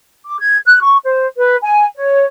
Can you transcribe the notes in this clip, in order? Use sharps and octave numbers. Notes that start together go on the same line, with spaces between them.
D6
G#6
F#6
C#6
C5
B4
G#5
C#5